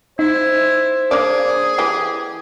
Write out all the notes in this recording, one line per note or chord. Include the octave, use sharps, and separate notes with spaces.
D#4 E4 C5
A#3 D4 G#4 D5
E3 G4